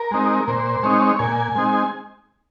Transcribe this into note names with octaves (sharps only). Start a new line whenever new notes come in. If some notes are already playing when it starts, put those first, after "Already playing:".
Already playing: A#4
G#3 C4 D#4
A#2 C5
G#3 C4 D#4 C#5
A#2 G#5
G#3 C4 D#4